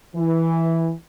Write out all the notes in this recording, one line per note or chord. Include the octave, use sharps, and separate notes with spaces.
E3